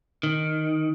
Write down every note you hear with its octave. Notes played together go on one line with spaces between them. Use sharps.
D#3